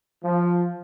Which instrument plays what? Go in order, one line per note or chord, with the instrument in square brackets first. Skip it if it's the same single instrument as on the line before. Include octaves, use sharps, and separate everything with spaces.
[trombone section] F3